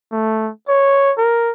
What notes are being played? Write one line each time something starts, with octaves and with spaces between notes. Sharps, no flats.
A3
C#5
A#4